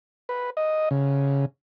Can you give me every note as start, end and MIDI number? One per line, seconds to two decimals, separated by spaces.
0.29 0.50 71
0.57 0.89 75
0.91 1.45 49